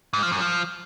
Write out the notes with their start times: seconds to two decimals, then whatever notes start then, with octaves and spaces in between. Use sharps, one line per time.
0.13 G#2
0.22 F3
0.32 F#2
0.41 F3